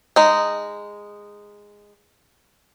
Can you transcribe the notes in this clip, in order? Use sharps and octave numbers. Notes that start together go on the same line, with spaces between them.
G#3 D#4